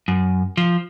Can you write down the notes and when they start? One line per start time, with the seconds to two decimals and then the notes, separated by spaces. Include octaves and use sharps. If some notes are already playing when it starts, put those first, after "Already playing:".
0.08 F#2
0.57 F3